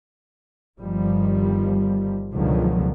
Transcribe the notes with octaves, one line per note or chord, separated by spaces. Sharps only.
G1 D#3 F3 G3
C#2 B2 D3 D#3 F3 F#3